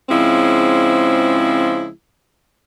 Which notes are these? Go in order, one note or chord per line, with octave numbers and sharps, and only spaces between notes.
C#3 F3 G#3 C4 E4